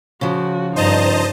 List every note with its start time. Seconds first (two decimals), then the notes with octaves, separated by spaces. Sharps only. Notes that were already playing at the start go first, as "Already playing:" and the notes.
0.21 C#3 F3 F#4
0.76 G2 D#4 C5 D#5 A5 A#5